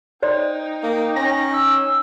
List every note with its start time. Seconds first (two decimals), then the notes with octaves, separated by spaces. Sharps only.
0.23 D#4 C5 D5 G5 C6
0.83 A#3
1.16 C#4 A#6
1.53 E6